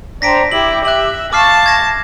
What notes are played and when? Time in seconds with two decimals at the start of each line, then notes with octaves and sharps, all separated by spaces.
0.22 D4 C5 G5 A#5 A#6 B6 D7
0.52 E4 G4 F#7
0.85 E5 F#6 F#7
1.33 F5 A5 C#6 D6 F6 C7
1.66 G#6 A#6